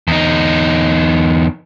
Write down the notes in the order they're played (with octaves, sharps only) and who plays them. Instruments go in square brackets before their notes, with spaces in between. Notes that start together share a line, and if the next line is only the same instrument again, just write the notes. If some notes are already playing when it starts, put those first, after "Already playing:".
[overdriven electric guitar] E2 D#4